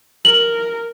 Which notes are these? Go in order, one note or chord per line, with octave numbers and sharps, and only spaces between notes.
A#4 F#7